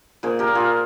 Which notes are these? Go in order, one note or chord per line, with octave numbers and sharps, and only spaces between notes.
A#2 G#4 C5
G4 A#4
A#2
F4 G#4